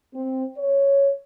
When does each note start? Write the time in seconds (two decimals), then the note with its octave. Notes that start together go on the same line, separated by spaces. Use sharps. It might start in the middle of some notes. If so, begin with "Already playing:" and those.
0.14 C4
0.58 C#5